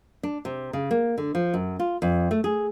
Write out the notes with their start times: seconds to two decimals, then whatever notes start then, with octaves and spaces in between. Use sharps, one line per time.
0.23 D4
0.45 C3
0.73 C#3
0.91 A#3
1.18 D3
1.35 F3
1.54 F#2
1.79 F4
2.02 F2
2.31 A3
2.44 G#4